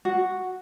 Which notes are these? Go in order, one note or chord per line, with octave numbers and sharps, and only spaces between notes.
F#4